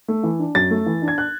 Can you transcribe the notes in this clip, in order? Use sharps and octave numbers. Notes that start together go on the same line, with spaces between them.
A3
E3
D4
F#2 A6
A3
E3
D4
G#6
F#6